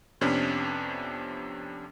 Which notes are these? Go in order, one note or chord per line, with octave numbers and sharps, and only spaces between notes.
F2 C3 B3 C#4 D4